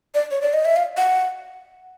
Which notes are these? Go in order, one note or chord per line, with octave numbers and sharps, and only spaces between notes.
D5
C#5
D5
D#5
E5
F5
F#5